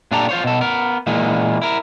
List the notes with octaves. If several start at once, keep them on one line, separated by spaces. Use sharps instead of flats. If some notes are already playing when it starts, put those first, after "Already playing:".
A#2 D4 F4 G4 A4 A#5
F4 C5 C#5
B2 A4
B3 A#4
A#2 E3 G#3 A#3 B3
E4 A#4